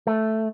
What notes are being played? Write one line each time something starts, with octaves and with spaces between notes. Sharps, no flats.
A3